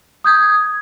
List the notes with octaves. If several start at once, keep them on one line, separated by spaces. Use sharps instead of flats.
D#6 G6 G#6